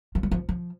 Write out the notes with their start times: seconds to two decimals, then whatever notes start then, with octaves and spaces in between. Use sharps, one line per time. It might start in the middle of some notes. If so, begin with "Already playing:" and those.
0.15 F3
0.23 G3
0.31 F3
0.49 F3